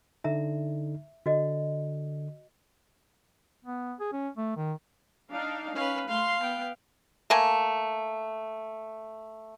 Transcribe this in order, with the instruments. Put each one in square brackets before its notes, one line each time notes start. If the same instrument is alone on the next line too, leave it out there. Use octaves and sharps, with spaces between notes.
[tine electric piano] D3 D#4 [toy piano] E5 A#5
[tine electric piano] D3 [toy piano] F#4 D#5
[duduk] B3
G#4
C#4
A3
D#3
[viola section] D4 D#4 F5
[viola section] C#4 [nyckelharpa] B4 F5
[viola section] A3 C6 [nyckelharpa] F5
[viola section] B3 G5
[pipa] A3 A#3 G#5